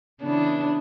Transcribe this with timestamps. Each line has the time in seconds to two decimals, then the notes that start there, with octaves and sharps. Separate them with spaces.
0.20 C#3 E3 B3 D4